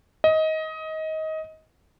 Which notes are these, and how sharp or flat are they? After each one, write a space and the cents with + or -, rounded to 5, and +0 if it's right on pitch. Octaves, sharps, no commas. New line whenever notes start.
D#5 +20